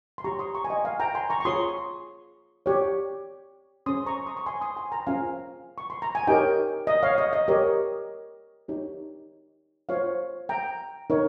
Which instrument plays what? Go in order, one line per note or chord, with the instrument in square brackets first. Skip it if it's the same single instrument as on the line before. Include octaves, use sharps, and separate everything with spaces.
[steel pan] C6
G4 C#5 A#5 C#6
C6 D#6
A#5 C#6
G#5
D#5 G5
F5 G#5
G5 A#5
G#5 C6
A#5 C#6
C#6
F4 G#4 C#5 C6 D#6
G4 C#5
C#4 G#4 C5 C6 D#6
A#5 C#6
C6 D#6
C#6
G#5 C6
C6 D#6
G#5 C6
G5 A#5
C#4 F4 G#4 C5 F5 G#5
C#6
C6
A#5
G#5
D#4 G4 A#4 C#5 D#5 G5
D#5
C#5 F5
D#5
D#5
G4 A#4 C#5 D#5
D#4 G4 C#5
F4 C5 C#5 F5
G5 A#5
D#4 A#4 C#5